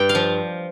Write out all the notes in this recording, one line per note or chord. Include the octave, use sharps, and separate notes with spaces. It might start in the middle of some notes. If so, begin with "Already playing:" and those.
Already playing: G2 G5
F5
F3